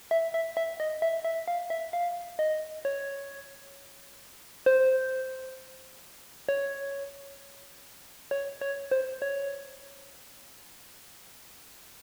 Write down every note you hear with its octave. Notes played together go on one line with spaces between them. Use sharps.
E5
E5
E5
D#5
E5
E5
F5
E5
F5
D#5
C#5
C5
C#5
C#5
C#5
C5
C#5